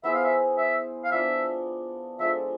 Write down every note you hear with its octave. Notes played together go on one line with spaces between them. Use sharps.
B3 E4 G#4 C5 E5
F5
E5
E5
F5
F3 B3 D4 E5
F3 G#3 D4 A4 E5